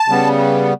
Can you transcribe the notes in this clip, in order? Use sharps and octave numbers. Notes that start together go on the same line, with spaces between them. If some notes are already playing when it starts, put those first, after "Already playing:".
Already playing: A5
C#3 G3 B3